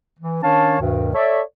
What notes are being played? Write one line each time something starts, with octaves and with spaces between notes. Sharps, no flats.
E3
D#3 C#4 D4 C#5 F5 A5
D2 G2 B2 D#3
A4 C#5 D5 E5